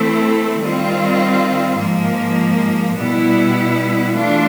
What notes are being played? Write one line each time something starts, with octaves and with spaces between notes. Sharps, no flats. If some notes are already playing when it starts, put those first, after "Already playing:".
Already playing: E3 A3 C4 E4
D#3 G3 C4 F4
G#2 F3 A#3
B2 G3 B3 E4
E3 A3 D4 F4